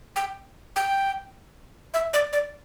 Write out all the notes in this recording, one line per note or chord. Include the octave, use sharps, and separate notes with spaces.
G5
G5
E5
D5
D5